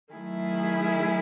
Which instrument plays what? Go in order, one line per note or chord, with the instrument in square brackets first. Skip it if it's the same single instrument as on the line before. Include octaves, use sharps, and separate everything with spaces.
[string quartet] D#3 F#3 A3 E4 G#4